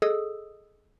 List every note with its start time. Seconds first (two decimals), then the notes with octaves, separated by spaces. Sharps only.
0.02 G#4 A4 D#5 D#6 E6